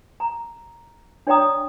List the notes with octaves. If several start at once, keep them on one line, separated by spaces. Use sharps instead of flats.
A#5
D4 C#5 D5 G5 A#5 D#6